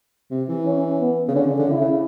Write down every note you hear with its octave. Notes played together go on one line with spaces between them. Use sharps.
C3
E3
C#4
B3
C#3
D3 C#4
C#3
D3
C#3 E4
C#3